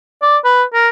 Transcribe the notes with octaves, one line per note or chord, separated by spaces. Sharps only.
D5
B4
A#4